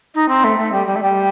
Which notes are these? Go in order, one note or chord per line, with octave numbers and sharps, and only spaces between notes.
D#4
C4
A3
A3
G3
G3
A3
G3